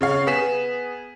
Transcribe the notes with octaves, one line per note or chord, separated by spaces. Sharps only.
C#3 C#5 F5
B3 G#4 B6 E7